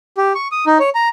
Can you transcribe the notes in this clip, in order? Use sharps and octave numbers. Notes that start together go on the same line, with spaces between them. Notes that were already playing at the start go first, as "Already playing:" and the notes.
G4
C#6
D#6
D#4
C#5
A#5